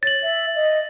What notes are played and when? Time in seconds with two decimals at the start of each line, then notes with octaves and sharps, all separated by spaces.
0.03 C#5 A6 F#7
0.22 E5
0.55 D#5